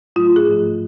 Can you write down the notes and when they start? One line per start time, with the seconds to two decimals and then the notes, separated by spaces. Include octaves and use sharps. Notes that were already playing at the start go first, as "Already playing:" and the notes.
0.16 A2 F#3 A3 F4
0.36 G#4
0.47 G#2 F3 A3